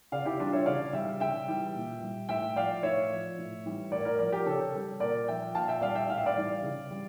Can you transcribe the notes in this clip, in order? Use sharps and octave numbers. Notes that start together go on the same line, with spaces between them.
C#3 D5 F5
E4 G4
E3 G3 D4 F4
C#5 E5
C#3 D5 F5
G3 E5 G5
C#3 E5 G5
E3 G3
A#2
G3
A2 E5 G5
F3 D5 F5
A2 C#5 E5
F3
A2
E3 G3
A2 A#4 D5
A#4 D5
F3 A#4 D5
G4 A#4
C#3 A4 C#5
G3
A#2 A#4 D5
F3 E5 G5
A#2 F5 A5
E5 G5
G3 D5 F5
E5 G5
A2 F5
E5
D5 F5
E3 G3
C#3
G3